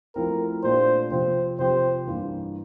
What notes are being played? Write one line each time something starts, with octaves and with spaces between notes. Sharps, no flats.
F3 A3 C4 E4 A#4
A#2 A3 D4 G4 C5
C3 F3 C4 C5
C3 F3 C4 G4 C5
G2 E3 A#3